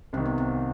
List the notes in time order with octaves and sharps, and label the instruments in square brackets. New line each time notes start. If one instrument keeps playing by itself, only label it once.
[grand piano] C2 C3 D#3 [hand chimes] C4
[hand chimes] B3
C4